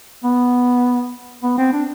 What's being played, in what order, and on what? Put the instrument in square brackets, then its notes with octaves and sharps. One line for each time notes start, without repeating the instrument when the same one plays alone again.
[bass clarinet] B3
B3
C4
D4